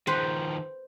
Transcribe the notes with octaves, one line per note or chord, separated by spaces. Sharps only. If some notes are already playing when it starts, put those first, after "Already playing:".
D#3 F3 B4 C5